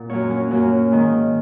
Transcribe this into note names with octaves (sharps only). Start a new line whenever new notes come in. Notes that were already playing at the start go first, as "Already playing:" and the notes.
Already playing: A#2 F#5
F#2 F#3 A#3 C#5
C#4
F#2 F#3 A#3
G#2 D#3 A#3